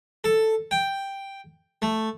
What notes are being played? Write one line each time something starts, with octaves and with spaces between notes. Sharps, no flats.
A4
G5
A3